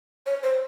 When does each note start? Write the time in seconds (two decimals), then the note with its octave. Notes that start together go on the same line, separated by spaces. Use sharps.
0.26 C#5
0.43 C5